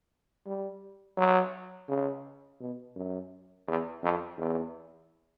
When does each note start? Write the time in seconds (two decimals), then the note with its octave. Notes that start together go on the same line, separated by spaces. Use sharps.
0.46 G3
1.17 F#3
1.88 C#3
2.60 B2
2.96 F#2
3.67 E2
4.03 F2
4.38 E2